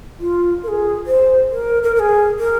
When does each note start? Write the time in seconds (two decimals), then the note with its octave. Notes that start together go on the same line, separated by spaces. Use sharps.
0.19 F4
0.63 A#4
0.68 G#4
1.07 C5
1.51 A#4
1.83 A#4
1.95 A#4
2.00 G#4
2.39 A#4